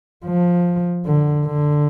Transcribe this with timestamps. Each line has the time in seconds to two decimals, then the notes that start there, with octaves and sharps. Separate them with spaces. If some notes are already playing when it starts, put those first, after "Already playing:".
0.26 F3
1.06 D3
1.46 D3